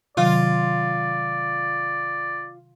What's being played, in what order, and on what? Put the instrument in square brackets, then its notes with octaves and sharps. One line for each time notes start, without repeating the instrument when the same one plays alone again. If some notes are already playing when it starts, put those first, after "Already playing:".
[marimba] C3 D#3 F#3 [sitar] F4 [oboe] D5